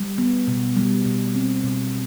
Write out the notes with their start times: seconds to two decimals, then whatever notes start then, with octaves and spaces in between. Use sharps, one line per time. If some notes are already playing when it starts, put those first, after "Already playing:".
Already playing: G3
0.18 B3
0.47 B2
0.76 G3
1.06 B2
1.35 C4
1.64 B2